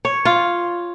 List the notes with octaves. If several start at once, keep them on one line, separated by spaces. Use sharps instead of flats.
C#5
F4